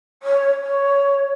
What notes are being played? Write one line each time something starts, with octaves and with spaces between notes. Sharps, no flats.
C#5
C#5